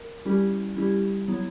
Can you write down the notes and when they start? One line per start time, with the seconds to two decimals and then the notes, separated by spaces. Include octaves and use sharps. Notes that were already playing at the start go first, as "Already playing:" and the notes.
Already playing: A#4
0.25 G3 C#4 E4 G4
0.76 G3 C#4 E4 G4
1.28 F#3 B3 E4